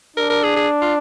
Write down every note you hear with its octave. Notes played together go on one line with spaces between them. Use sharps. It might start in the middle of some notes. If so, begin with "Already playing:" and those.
D4 A#4
A#4
G#4
G#4
F4